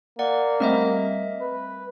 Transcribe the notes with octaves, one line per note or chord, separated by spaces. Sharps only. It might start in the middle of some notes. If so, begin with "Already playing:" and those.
A#3 D5 F#5
G3 A3 C4 A#4 D#5 E5
B4